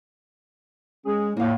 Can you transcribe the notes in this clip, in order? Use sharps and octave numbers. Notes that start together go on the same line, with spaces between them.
G#3 C#4 G#4
A2 A#3 F5